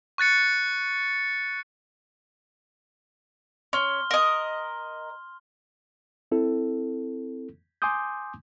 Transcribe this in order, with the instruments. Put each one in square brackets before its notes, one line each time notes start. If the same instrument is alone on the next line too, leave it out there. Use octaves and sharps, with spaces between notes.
[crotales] C#6 F#6 A6 C#7
[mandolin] C#4 [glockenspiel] C6 F6 G7
[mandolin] A#4 D#5
[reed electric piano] C4 E4 A4
G#5 C6 D6 D#6 G6